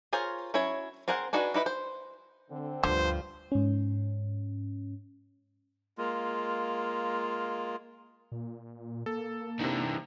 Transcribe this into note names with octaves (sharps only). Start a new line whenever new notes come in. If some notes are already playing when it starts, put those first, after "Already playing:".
F4 G#4 A#4 C5 C#5
F#3 C#4 E4 C#5
C4 G#4 A#4 C5 F#5
D4 D#4 F#4 G#4 B4
D#4 E4 B4 D#5
C5
D3 C4
D2 G2 D3 F3 C5
G#2 C#4
G#3 A#3 F4
A#2
A#3 A4
C3 E3 D4 D#4